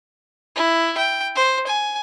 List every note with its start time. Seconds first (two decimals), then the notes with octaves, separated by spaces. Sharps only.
0.55 E4
0.98 G5
1.35 C5
1.67 G#5